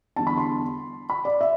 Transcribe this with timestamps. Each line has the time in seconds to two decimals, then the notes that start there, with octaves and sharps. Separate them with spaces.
0.16 E2 D3 G3 A5
0.27 B5
0.38 C6
1.10 B5
1.25 D5
1.41 E5